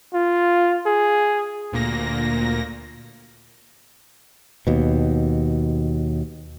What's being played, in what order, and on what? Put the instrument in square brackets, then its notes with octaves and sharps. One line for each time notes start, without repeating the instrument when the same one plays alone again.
[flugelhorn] F4
G#4
[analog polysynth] D2 A#2 A#3 A#6
[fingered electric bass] D#2 B2